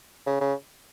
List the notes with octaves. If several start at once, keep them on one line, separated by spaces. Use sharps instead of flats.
C#3
C#3